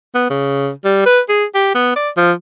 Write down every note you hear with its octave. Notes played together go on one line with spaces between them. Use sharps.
B3
C#3
G3
B4
G#4
G4
B3
D5
F3